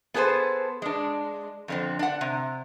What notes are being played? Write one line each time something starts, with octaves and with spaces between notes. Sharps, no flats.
B3 G#4 A4 B4 C5
G#3 D4
F2 D3 C4
D4 F#5
C3